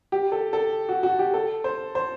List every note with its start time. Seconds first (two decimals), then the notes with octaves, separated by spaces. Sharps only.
0.12 G4
0.32 A4
0.53 A4
0.89 F#4
1.03 F#4
1.19 G4
1.34 A4
1.64 C5
1.95 C5